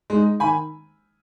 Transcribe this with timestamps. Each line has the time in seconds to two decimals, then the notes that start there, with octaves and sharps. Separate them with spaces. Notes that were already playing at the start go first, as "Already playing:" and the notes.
0.10 G#3 D#4
0.40 D#3 G#5 B5